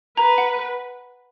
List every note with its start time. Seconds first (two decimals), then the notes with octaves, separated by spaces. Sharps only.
0.17 B4 A#5
0.38 F#5